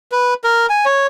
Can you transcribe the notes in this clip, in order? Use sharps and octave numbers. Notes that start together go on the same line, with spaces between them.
B4
A#4
G#5
C#5